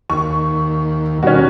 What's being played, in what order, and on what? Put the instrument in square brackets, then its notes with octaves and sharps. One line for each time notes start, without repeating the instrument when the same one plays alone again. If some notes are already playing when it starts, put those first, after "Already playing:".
[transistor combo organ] D#2 [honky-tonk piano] C#6
[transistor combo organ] B2 D#3 G3 [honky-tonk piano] C#4 F#4